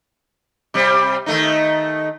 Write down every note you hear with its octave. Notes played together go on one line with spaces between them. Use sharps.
C3 G3 C4
D#3 A3 D#4